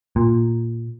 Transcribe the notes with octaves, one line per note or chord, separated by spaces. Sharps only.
A#2